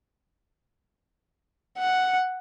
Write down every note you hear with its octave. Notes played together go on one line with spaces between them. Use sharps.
F#5